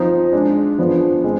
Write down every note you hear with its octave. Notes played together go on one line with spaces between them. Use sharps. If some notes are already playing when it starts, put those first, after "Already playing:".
Already playing: F3 C4 D#4
G#3 D4 G#4
F3 B3 D4
G#3 C4